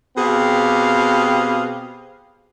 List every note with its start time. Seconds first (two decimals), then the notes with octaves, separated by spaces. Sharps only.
0.17 B2 C4 G4 G#4 F5